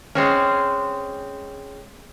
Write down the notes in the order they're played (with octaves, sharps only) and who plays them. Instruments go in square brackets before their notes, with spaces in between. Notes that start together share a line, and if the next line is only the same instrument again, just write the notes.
[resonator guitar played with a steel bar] G#3 C4 C#4